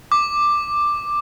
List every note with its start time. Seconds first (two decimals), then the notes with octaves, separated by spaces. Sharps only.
0.12 D6